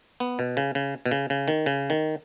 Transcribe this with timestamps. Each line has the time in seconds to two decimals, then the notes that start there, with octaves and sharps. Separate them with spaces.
0.20 B3
0.39 B2
0.57 C#3
0.75 C#3
1.06 B2
1.11 C#3
1.30 C#3
1.48 D#3
1.66 C#3
1.90 D#3